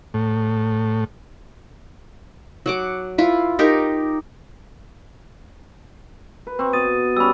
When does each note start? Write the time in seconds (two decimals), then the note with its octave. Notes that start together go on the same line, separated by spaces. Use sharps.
0.14 A2
2.66 F#3 F#5 D6
3.18 E4 F4 B4
3.59 D#4 G4 A#4
6.47 B4
6.59 C4 C#6
6.73 B2 D#6 A6 D#7
7.17 G3 C#4 B5 E6